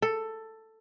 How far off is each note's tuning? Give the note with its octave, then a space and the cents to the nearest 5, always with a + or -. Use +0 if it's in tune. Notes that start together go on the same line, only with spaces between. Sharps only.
A4 +10